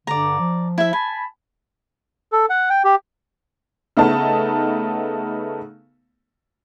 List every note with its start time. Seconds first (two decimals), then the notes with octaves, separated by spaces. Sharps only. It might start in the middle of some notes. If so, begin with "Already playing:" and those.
0.07 G2 D3 D5 A#5
0.39 F3
0.78 E4 E5
0.93 G#5 A5 B5
2.32 A4
2.50 F#5
2.70 G5
2.84 G4
3.97 C#3 A3 B3 D#4 A5